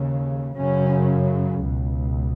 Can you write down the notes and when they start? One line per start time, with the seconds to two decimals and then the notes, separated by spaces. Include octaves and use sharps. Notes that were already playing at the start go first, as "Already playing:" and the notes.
Already playing: D#2 C#3
0.57 F#2 C#3 C#4
1.61 C#2 B2